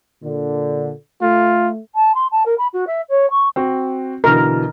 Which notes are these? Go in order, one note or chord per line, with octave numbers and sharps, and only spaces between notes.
A#2 D3
A3 F4
A5
C6
A5
A#4
B5
F#4
E5
C#5
C#6
C4 F#4
B2 D3 E3 A#4